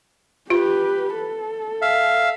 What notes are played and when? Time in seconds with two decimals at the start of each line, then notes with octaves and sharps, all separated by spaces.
0.50 F4 G4 B4
1.15 A4
1.82 E5 F5